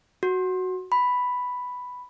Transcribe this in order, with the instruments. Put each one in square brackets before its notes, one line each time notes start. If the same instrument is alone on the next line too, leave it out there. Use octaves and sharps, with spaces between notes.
[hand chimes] F#4
B5